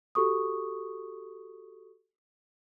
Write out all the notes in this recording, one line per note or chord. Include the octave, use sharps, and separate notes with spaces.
F#4 G4 A4 C#6 D#6